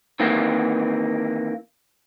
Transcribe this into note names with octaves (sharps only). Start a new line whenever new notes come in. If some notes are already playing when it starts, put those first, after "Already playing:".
D#3 E3 A#3 C4